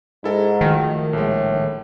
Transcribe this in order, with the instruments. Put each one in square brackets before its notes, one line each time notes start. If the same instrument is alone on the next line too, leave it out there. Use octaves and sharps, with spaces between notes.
[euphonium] G#2 [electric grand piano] E4 A4 A#4
[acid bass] D#3 [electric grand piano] F3 F#3 A3
[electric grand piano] A#1 G#3 [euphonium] A2